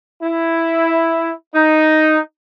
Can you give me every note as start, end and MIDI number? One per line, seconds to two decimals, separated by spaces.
0.22 1.32 64
1.54 2.18 63